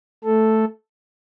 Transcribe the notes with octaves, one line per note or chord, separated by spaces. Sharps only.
A3 A4